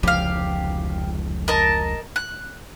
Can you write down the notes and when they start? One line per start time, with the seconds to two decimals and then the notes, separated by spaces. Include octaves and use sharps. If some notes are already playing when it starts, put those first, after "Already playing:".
0.03 F1 C#2 F3 G4 F5
1.48 A#4 D#5 A5
2.16 F#6